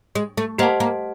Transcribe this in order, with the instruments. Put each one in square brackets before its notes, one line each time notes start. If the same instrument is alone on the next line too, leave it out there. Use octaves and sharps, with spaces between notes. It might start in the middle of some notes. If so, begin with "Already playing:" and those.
[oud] G#3
A3
[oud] A#3 [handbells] G4 C5 D#5 F#5 A5
[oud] A#3